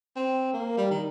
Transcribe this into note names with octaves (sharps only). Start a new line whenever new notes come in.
C4
A#3
G3
D#3